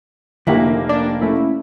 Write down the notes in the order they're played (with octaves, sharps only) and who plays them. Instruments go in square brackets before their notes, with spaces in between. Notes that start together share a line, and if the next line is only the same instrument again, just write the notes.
[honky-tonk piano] F1 A#3 G4 [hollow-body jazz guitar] D3 E4
[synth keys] D4 [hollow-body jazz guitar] D5
[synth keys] A3 C#4 E4